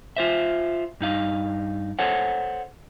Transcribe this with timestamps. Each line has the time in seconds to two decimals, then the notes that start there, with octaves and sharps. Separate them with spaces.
0.16 F4 C5 E5
1.00 G2 D#4 F5
1.99 A4 C5 C#5 F#5